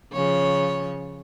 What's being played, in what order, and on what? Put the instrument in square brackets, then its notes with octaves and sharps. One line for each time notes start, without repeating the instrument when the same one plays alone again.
[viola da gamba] C#3 F3 C#5